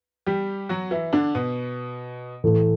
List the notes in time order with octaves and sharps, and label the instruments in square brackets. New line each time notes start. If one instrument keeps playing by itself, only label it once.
[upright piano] G3 G4
F#3 F#4
E3 E4
D3 D4
B2 B3
[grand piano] A2 E3 A3